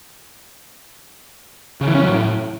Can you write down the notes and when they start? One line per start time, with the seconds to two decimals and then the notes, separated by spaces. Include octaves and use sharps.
1.81 C#3
1.88 E3
1.95 C#4
2.02 F#3
2.09 A2